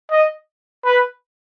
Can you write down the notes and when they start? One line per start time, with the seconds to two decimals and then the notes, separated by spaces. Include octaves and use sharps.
0.11 D#5
0.85 B4